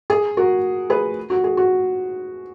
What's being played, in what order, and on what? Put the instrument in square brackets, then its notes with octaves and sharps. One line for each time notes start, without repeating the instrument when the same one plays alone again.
[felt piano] G#4
F#4 A#4
G#4 B4
F#4
G#4
F#4